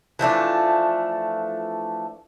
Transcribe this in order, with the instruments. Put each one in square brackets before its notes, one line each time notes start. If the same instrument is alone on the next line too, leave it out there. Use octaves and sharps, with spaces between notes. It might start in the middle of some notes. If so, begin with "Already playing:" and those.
[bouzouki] E3 F3 A3 D4